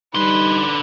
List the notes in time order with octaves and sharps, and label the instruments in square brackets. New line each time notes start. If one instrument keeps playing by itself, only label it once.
[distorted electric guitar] D3 C6 [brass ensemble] G3 D#4 [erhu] B4